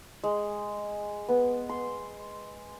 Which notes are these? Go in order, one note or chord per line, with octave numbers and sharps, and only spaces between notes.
G#3
B3
C6